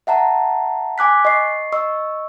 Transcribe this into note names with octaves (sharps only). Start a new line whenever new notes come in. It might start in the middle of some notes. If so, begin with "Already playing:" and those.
E5 F#5 A5 A#5
G#5 D6 F#6 B6
D#5 C#6 C7
D#5 C#6 E6